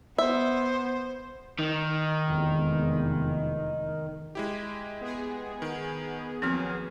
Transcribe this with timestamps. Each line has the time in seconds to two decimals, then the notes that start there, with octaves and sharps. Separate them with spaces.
0.18 B3 C5 E5
1.59 D#3
2.27 F1 E2 G#3
4.35 G#3 E4 G4
5.01 B3 G#4
5.62 D#3
6.42 D#2 F3 F#3 C4 F6